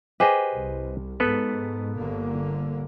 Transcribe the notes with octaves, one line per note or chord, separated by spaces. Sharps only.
G4 G#4 B4 C5 D#5
C2
G#2 B3 A4 B4
G1 D3 A#3